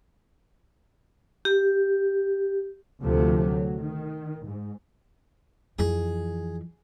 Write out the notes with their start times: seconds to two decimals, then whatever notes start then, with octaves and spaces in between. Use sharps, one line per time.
1.45 G4
3.02 D2 C3 F3 A3
3.45 F#3
3.82 D#3
4.45 G#2
5.79 F2 E3 G#4